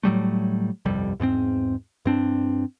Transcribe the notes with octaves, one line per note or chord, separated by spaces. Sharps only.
A2 F#3 G3 A3
G1 C2 F2 G3
E2 G#2 B3 C4
G2 C4 D4